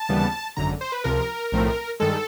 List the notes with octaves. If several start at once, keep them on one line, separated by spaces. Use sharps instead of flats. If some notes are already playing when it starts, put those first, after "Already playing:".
Already playing: A5
D#2 C#3 E3 G3 B3
G#1 F#2 D3 A#5
C5
B4
C#2 C3 F3 A#4
B1 A2 F3 A3 C4
G2 D#3 G#3 A4